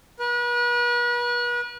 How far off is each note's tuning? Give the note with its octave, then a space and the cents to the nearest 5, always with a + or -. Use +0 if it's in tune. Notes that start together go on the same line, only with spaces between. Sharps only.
B4 -40